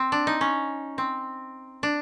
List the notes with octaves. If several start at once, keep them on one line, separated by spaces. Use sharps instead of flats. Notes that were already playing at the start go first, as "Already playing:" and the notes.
Already playing: C4
D4
D#4
C#4
C4
D4